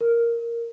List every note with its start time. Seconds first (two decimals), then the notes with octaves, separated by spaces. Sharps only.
0.01 A#4